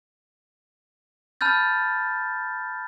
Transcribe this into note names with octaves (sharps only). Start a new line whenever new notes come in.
A5 B5 F6 G6 A6